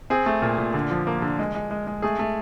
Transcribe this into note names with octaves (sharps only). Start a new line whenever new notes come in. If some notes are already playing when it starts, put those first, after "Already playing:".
C4 G#4
A3
A#2
A#2
D3
F3
A#3
D3
G#3
G#3
G#3
G#3
A3 G#4
A3